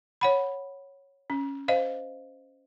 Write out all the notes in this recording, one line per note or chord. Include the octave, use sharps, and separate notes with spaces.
C#5 F#5 B5
C#4
C5 D#5 F5